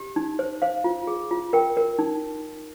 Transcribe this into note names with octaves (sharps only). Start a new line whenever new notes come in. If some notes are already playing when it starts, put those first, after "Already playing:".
Already playing: G4
D#4
C5
C5 F5
F4
G#4
F4
A#4 G5
A#4
D#4